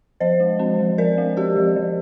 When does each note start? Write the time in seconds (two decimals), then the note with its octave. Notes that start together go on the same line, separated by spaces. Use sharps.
0.20 F3 C5 D#5
0.40 G#3
0.59 C4
0.79 F3
0.98 F3 A#4 D5
1.18 G#3
1.37 C4 G4 A#4
1.56 F3
1.76 F3